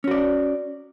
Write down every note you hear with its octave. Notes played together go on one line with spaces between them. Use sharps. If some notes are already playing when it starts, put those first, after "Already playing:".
C#4 F#4 D5